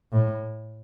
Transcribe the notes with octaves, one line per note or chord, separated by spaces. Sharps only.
A2